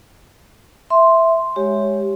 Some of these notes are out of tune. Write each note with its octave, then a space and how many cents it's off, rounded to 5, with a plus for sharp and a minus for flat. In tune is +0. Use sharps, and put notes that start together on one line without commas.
E5 +0 C6 +0
G#3 +0 G4 +0 C#5 +0